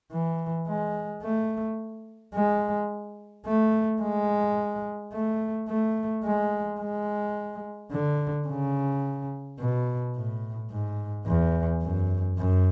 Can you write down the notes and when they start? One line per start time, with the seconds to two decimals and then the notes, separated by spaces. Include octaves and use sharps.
0.12 E3
0.68 G#3
1.23 A3
2.34 G#3
3.46 A3
4.02 G#3
5.13 A3
5.69 A3
6.24 G#3
6.81 G#3
7.92 D3
8.48 C#3
9.59 B2
10.15 A2
10.71 G#2
11.26 E2
11.83 F#2
12.38 F#2